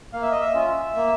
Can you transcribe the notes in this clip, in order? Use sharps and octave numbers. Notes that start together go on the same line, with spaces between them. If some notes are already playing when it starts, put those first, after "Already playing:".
A#3 F5
E5
D#5
E5
C#4 F4
A#3